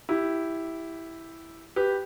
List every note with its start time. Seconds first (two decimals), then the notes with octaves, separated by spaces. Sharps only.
0.09 E4 G4
1.76 G4 B4